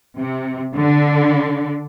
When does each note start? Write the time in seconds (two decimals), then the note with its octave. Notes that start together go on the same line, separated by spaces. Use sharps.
0.17 C3
0.76 D3